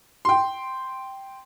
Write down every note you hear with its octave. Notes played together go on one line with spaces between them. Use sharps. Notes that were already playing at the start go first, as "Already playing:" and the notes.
G5 C6